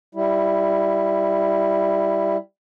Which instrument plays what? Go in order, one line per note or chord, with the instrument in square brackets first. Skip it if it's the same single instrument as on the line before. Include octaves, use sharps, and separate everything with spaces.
[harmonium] G3 E4